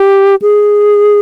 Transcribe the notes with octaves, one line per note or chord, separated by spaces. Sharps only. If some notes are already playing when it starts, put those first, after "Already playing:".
Already playing: G4
G#4